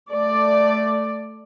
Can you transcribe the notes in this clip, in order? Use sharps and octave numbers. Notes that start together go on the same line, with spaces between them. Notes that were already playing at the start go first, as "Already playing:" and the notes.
A3 D5